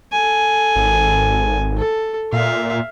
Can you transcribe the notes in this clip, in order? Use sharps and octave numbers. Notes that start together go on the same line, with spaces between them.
A4 G#5
G#1
A4
A#2 E5 F5